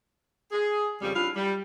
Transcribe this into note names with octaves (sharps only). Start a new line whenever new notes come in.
G#4
F2 C#3 G3
D4 E4 F4 F5
G3